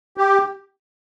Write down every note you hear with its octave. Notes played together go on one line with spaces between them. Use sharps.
G4